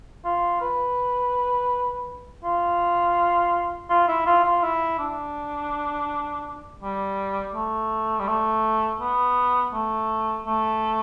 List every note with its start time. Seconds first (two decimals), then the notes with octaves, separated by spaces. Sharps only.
0.25 F4
0.61 B4
2.44 F4
3.90 F4
4.08 E4
4.26 F4
4.44 F4
4.63 E4
4.99 D4
6.82 G3
7.54 A3
8.20 G3
8.28 A3
9.01 B3
9.74 A3
10.47 A3